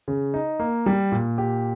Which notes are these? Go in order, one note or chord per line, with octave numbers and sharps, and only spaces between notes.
C#3
D#4
A#3
G3
A#2
G4